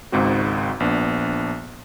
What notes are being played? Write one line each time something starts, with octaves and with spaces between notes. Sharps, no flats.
G#1 C#2 G#2 C4 F#4
A#1 B3 D4